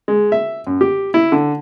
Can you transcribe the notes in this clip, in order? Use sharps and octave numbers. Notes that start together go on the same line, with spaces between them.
G#3
E5
F#2
G4
E4
D3